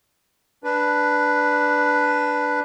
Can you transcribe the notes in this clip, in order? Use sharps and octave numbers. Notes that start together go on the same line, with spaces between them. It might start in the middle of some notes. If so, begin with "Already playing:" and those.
D4 B4